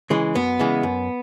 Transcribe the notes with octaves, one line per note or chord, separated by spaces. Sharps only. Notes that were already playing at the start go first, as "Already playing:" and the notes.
C#3 E3 G#3
F#2 B3
C#3 E3 G#3
F#2